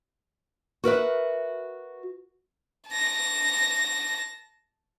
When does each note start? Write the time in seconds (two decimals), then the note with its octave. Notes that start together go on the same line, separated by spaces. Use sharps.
0.84 F#4 A#4 B4 E5
2.91 A5 A#6